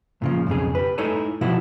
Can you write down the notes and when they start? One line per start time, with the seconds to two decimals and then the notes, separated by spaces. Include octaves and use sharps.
0.22 A#2 C#3 F3
0.47 B1 F2 C#3 G#4
0.75 G4 B4
0.98 A3 D#4 E4 A4 C#5 G#5
1.41 B2 F3 E4 F#4